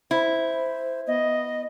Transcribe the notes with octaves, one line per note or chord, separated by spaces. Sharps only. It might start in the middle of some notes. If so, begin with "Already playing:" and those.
E4 C5
B3 D#5